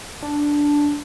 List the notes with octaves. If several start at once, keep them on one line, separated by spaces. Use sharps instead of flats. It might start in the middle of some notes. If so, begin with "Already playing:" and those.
D4